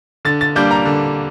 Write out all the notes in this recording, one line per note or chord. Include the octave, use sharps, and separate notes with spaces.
D3 A6
A6
G3 A#3 D4 G6
A#5
D3